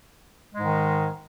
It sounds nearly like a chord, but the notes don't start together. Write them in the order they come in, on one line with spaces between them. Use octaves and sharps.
G#3 G#2 D#3